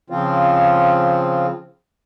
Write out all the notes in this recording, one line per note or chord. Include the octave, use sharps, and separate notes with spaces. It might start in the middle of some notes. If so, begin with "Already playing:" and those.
C#3 F3 C4 F4